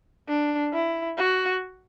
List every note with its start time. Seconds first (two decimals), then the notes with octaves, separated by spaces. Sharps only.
0.28 D4
0.73 E4
1.18 F#4